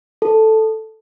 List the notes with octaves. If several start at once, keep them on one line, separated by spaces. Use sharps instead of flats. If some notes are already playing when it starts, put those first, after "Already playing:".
A4